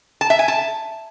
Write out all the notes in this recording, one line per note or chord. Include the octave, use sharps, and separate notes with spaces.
A5
E5
G#5
A5